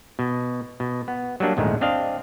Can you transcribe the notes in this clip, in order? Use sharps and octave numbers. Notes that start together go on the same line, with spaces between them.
B2
B2
B3
F#3 G3 A#3 D4
A#1 E2 G#2 D#3 G#3 A3
C4 D4 D#5 F5